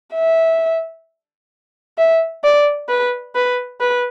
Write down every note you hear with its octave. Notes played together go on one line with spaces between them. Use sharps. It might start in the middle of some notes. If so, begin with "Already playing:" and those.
E5
E5
D5
B4
B4
B4